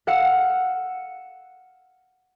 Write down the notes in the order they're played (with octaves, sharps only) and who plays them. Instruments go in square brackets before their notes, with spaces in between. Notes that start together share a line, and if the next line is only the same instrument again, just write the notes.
[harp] F5 F#5 E6 C#7